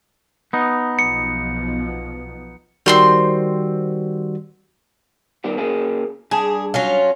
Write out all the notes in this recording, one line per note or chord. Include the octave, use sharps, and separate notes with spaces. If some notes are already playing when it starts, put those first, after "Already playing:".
B3 D#4
B1 B2 F3 C#7
D#3 G3 C4 F#4 C6 G6
D#3 G3 B3
C#3 A#3 G#4
G2 G#4 A5
F#3 C#4 F4